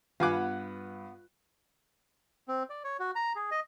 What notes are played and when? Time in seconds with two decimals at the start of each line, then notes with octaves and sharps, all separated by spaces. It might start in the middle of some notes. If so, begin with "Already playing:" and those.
0.20 G2 B3 F4 F5 G#5 D6 F#6
2.48 C4
2.70 D5
2.84 C#5
3.00 F#4
3.15 A#5
3.35 G#4
3.51 D#5